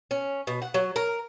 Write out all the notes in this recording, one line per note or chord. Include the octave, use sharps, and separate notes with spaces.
C#4
B2
F#5
F#3
A#4